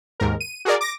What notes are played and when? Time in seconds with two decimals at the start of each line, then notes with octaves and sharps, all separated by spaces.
0.20 D#2 G#2 A#4
0.41 D#7
0.65 F#4 G#4 A#4 D5
0.81 D6 A#6